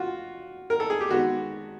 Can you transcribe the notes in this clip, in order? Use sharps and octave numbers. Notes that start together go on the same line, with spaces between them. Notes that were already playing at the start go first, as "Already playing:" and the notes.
Already playing: F4 F#4
A#4
A4
G#4
G4
D#3 G#3 B3 F#4